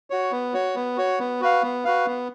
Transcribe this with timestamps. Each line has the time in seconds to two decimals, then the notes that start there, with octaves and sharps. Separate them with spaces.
0.10 F#4 C#5
0.32 B3
0.54 F#4 C#5
0.75 B3
0.97 F#4 C#5
1.19 B3
1.41 F#4 B4 F5
1.63 B3
1.85 F#4 B4 F5
2.06 B3